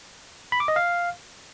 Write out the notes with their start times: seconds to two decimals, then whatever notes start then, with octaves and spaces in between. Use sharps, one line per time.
0.52 B5
0.60 D6
0.68 D#5
0.76 F5